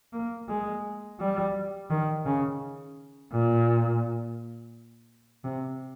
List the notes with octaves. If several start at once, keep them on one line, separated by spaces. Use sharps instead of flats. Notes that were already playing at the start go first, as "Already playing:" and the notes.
A#3
G#3
G3
D#3
C#3
A#2
C3